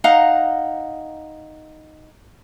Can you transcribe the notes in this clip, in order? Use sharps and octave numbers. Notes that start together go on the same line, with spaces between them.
D#4 F5 F#5 A#5